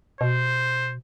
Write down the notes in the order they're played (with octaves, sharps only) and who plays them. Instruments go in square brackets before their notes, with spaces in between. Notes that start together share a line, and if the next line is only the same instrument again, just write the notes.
[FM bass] B2 [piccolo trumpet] C5